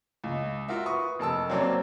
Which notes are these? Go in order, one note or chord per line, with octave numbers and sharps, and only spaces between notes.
C#2
F4 F#4 A#4 E5
B4 C#6 D#6
F1 A#4 A5 E6
F#3 A#3 C4 C#4 C5 D5